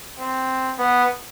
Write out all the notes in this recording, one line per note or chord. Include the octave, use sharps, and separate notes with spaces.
C4
B3